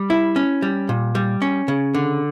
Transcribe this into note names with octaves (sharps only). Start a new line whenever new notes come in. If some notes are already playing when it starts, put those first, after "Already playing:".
Already playing: G3
E4
C#4
G3
A#2
G3
C#4
C#3
D3